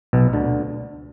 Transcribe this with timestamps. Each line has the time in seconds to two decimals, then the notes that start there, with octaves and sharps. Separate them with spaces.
0.13 B1 B2
0.33 D2 D3